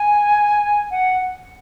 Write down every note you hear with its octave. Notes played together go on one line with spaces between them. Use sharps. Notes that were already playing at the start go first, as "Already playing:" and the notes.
Already playing: G#5
F#5